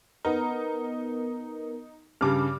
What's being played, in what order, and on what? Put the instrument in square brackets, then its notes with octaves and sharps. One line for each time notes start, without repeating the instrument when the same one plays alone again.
[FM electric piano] B3 A#4 [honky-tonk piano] D#4
[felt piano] G2 C#3 [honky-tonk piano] G3 D6 F6